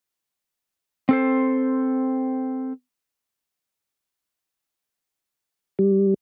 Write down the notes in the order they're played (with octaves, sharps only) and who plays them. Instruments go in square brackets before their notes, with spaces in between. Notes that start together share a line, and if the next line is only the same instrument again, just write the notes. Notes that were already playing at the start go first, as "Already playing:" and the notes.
[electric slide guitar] C4 A4 C5
[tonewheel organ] G3